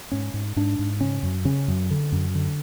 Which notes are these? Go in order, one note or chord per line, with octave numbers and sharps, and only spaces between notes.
G#2 C#4
G#2
G#2 D4
G#2
C#3 C#4
F#2
C#3 C#4
F#2
D3
F#2
D3